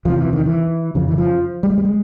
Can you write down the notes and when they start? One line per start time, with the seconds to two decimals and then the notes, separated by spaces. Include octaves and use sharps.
0.05 E2 C3 F3
0.18 E3
0.33 D#3
0.46 E3
0.95 F2 C#3 F3
1.08 E3
1.18 F3
1.63 G3
1.70 G#3
1.78 G3
1.85 G#3